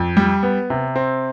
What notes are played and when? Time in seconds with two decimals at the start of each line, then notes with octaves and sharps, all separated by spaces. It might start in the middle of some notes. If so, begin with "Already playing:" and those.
Already playing: F2
0.17 G3
0.43 B3
0.70 C3
0.96 C4